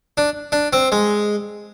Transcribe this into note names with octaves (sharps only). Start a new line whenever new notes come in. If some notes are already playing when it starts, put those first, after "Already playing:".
D4
D4
C4
G#3